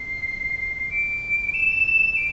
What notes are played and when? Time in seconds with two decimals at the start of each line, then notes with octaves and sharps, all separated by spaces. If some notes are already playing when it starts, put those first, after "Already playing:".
Already playing: C7
0.91 D7
1.54 E7
2.16 D7